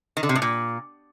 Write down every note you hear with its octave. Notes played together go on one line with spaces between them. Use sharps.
D#3
D3
C3
A2
A#2